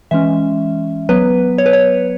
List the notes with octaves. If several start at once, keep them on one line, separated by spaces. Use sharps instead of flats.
E3 G#3 C#4 E5
F#3 B3 B4
C#5
B4
C#5